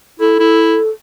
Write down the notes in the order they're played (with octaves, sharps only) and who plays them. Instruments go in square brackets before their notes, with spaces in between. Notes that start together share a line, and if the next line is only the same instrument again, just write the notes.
[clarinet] E4 [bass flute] A4
[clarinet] E4